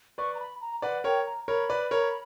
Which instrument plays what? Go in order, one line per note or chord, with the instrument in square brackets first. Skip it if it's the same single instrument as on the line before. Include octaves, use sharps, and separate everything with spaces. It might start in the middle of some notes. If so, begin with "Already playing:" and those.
[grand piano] B4 D5 [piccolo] C#6
[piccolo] A#5
B5
A#5
[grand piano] B4 D5 [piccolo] F#5
[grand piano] A#4 C#5 [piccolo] G5
[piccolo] A#5
[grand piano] A#4 C#5 [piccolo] B5
[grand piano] B4 D5
A#4 C#5